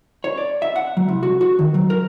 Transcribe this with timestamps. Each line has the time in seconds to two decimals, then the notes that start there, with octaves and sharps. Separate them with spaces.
0.24 C#5
0.38 D5
0.62 E5
0.76 F#5
0.97 F#3
1.09 C2
1.23 F#4
1.41 F#4
1.59 D#3
1.74 F#3
1.90 A#4